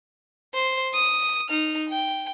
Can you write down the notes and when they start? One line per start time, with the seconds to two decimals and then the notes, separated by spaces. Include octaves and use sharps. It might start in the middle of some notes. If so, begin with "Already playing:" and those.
0.54 C5
0.93 D#6
1.50 D#4 F6
1.89 G5